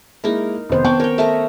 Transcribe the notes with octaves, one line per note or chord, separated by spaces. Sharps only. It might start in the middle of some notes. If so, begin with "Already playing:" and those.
G#3 A#3 D#4 E4 A#4
F1 D#3 B3 C5
B3 C#4 D4 G5 C#6 D6
A#4 C#5 G5
A3 A#4 D#5 E5